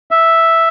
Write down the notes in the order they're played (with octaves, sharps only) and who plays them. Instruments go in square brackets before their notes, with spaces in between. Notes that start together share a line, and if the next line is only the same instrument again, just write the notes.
[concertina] E5